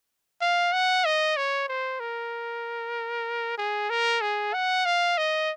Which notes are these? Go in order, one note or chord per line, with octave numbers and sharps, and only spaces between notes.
F5
F#5
D#5
C#5
C5
A#4
G#4
A#4
G#4
F#5
F5
D#5